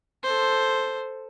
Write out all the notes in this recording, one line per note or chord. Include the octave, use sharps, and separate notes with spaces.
A4 C5